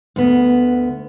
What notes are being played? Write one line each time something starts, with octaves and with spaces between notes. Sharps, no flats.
D2 B3